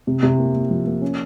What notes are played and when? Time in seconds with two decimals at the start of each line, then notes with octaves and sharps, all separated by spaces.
0.07 C3
0.23 C3
0.38 A#3
0.54 A#3
0.70 F3
0.86 A#3
1.02 C#4